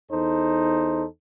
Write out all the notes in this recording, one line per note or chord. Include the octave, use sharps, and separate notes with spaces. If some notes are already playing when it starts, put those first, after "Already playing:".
E2 D#4 A4 C5